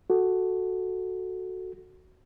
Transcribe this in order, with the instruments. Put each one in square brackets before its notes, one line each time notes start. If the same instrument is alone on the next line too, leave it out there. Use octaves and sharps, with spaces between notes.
[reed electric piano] F#4 A4